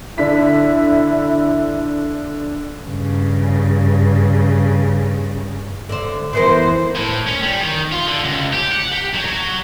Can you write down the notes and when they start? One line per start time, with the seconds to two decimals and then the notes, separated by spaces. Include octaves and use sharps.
0.18 D3 E4 B6
2.84 G2 C#3
5.89 D3 C5
6.33 E3 B3 A#4 C5
6.96 A2
7.27 C#4
7.43 G3
7.60 D#3
7.92 F4
8.07 D3
8.24 C#2
8.53 G4
8.72 F#5
8.92 G4
9.14 F#3
9.25 F#3